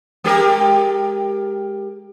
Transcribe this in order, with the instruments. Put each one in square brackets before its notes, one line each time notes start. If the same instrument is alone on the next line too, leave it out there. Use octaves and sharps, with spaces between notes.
[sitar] G#3 G4 A#4